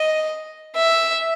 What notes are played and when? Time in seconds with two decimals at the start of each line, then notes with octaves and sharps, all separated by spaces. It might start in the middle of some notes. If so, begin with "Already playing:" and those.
Already playing: D#5
0.76 E5